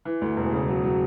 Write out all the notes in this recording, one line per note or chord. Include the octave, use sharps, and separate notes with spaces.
E3
D2
E1
C#3
F#3
F#3